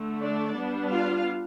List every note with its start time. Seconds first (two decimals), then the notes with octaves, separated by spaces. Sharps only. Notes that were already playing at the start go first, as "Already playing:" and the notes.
Already playing: D3 A3
0.19 D4 D5
0.54 G3 B3 D4
0.89 F4 F5